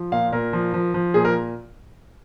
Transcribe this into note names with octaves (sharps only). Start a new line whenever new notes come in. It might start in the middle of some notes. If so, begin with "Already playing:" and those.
Already playing: F3
A#2 F5
A#2 A#4
F3
F3
F3
A#2 G#4
A#4